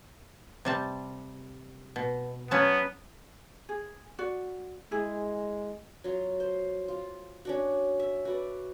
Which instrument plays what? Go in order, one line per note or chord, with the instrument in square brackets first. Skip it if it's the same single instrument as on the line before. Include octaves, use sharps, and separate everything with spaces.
[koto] C3 G3 A5
B2
[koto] F#3 C#4 A5 [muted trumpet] B3
[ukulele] G#4
F#4 D5
[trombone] G#3 [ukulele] E4 G#4
[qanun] F#3 F4
C5
F4
C#4 D4 F#4
E5
F#4 B4 D5